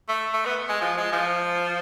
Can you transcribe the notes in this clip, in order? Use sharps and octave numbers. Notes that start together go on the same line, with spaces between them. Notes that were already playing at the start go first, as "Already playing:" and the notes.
A3
A3
B3
G#3
F3
G#3
F3